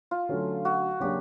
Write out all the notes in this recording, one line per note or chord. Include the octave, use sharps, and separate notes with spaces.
F4
D3 F#3 A3 C#4
F#4
C#3 F#3 A#3 D4 G4